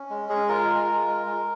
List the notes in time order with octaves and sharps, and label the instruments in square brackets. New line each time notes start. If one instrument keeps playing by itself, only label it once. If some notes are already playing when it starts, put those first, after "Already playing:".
Already playing: [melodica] C#4
G#3
G#3 G#4
F4 A#4
G#3
F4
G#3
G#3